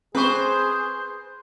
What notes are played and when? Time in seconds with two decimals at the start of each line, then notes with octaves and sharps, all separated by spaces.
0.15 C4 G#4 B4 C5 C#6